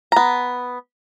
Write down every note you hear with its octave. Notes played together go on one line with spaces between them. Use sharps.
B3 A#5